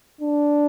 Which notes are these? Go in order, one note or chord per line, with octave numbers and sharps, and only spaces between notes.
D4